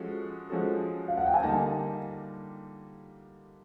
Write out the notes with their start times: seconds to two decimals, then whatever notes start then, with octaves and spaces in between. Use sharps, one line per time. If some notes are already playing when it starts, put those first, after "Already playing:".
Already playing: F3 G#3 C#4 F#4 A4
0.50 F3 G#3 C#4 F#4 A4
1.08 F5
1.17 F#5
1.26 G5
1.34 G#5
1.42 D3 G3 A#3 D#4 A5